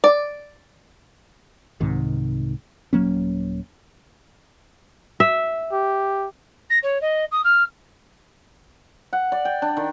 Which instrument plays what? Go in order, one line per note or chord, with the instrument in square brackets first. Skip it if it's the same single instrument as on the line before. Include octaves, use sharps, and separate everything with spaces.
[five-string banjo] D5
[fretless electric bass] C2 G#2 C3 D#3
D#1 F#3 A#3 C#4
[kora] E5
[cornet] G4
[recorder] A#6
C#5
D#5
D#6
F6
[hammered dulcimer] F#5
D5
G5
D4
D#3